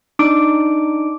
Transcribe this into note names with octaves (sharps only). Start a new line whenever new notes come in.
D4 D#4 D6 D7